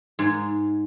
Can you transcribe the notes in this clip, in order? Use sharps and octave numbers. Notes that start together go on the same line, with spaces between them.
G#2